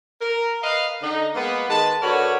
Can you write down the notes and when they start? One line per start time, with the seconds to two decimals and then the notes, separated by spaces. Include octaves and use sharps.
0.21 A#4
0.62 A#4 B4 D#5 F5
1.02 D3 D#4
1.35 G#3 A#3 B3
1.68 D#3 G#3 B3 B4 A5
2.02 D3 F#4 A#4 B4 C#5